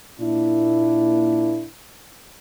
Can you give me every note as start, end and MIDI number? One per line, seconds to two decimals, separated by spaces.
0.19 1.65 46
0.19 1.65 58
0.19 1.65 62
0.19 1.65 64